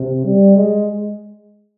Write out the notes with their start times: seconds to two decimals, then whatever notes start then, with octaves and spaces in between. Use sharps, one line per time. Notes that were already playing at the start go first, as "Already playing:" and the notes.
Already playing: C3
0.25 G3
0.55 G#3